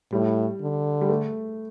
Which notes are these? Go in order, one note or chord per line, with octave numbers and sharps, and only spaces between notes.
A2 G3
D3
G3
A3